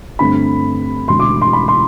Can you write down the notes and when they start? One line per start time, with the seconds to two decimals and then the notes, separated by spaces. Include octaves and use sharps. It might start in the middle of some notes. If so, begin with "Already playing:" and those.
0.19 G2 D3 A3 C4 B5
1.08 E1 D2 D3 C6
1.20 D6
1.41 C6
1.53 B5
1.68 C6